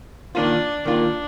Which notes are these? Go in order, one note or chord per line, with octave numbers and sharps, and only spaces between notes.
D#3 A#3 D4 F4
D#3 A#3 D4 F4